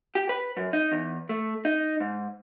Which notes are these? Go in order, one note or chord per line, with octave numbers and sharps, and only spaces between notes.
G4
B4
F#2
D#4
E2
A3
D#4
G#2